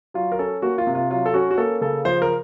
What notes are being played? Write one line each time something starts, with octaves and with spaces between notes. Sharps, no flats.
F#3 F4
A#4
C#4 A4
A#3 F#4
F4
C3
F4
F#3 F4
A4
C#4 F#4
F#4
A#3 A4
C#3 A4
F3 C5
A#4